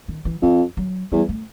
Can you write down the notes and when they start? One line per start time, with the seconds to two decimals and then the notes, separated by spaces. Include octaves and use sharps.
0.08 D#3
0.25 E3
0.42 F2 F3
0.77 F#3
1.12 E2 G3
1.29 A3